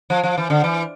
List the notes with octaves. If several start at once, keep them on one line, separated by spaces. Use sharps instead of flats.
F3
F3
E3
D3
E3